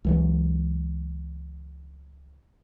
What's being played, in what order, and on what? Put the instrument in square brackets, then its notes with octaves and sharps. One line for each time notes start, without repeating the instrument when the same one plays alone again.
[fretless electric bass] C#2 E3 F#3